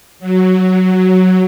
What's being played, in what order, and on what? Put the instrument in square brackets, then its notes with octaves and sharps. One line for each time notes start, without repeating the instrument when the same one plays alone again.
[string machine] F#3